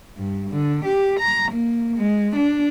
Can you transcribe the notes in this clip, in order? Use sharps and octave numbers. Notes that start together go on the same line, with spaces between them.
G2
D3
G4
A#5
A#3
G#3
D4